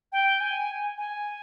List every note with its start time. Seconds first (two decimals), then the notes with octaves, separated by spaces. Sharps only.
0.12 G5
0.40 G#5
0.98 G#5